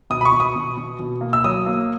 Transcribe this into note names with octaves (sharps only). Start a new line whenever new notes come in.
B2 D#6
B5
C#6
B2
D#6
B2
B2
B2
A#3
E6
F#3 D#6
A#3